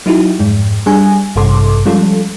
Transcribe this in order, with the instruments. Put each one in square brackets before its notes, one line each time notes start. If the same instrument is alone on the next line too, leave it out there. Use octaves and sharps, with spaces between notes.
[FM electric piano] F#3 D#4 E4 F#4 G4
F2 G#2 G#3
G3 D4 G#4 G#5
A1 G2 C3 A4 C6 D6
F3 G3 G#3 C#4 F4 A4